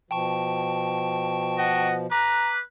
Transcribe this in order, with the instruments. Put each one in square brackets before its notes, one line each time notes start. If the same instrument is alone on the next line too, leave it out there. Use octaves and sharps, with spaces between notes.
[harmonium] B2 F3 [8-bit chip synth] G5 A5 C#6
[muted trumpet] D#5 [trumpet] F#5
[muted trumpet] B4 [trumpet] A#5 [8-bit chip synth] D6 F#6